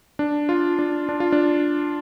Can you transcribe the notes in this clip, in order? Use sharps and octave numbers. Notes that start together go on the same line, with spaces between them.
D4
F4
D4
D4
F4
D4